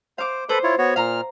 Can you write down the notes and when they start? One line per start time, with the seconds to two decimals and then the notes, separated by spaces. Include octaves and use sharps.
0.18 C5 F5 D6
0.49 A4 B4 C5 B5
0.64 E4 F4 C#5
0.78 B3 F#4 C#5
0.96 A#2 F5 A#5 F6